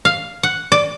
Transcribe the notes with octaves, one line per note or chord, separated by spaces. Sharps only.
F5
F#5
D5